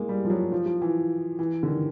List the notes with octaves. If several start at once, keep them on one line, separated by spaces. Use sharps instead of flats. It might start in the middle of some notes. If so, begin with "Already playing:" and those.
Already playing: G#3 A#3
G3
F3
F#3
F3
F3
E3
E3
D3
D#3